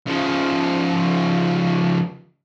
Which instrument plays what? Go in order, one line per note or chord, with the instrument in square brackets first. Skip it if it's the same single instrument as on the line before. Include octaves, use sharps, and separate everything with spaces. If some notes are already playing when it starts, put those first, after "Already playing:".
[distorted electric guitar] C#3 F3